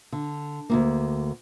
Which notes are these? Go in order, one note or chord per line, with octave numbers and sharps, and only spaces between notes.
D3
D2 G2 A#3